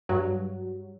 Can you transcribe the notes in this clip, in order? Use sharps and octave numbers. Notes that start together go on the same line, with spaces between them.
G2 F#3